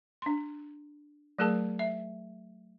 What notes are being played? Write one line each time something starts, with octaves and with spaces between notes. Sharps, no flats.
D4 C6
F#3 A3 G#4 A#4 A5
E5